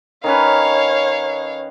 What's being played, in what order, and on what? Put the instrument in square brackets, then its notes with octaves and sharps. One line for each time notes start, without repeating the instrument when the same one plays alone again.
[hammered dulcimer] D#3 C#4 B4 [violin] C#5 F5